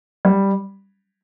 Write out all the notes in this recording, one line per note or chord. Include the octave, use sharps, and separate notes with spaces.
G3